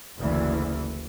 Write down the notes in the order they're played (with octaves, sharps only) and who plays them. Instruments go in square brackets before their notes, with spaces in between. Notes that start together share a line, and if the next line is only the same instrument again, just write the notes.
[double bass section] F#1 D2 E3